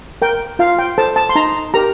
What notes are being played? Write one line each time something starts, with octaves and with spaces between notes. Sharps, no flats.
A#4 G5
F4 F5
G5
A4 C5 A5
A5
C6
D#4 A#5
G4 A#4 A#5